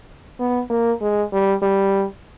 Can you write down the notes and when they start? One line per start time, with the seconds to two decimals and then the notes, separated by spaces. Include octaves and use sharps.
0.40 B3
0.70 A#3
1.01 G#3
1.32 G3
1.62 G3